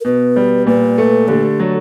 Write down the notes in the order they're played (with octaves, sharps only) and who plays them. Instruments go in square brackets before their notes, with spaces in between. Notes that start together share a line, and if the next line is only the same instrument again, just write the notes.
[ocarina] A#4
[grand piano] B2 [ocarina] B4
[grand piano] G3
[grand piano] A#2 [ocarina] B4
[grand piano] A3
[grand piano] D3 [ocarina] G4
[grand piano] F#3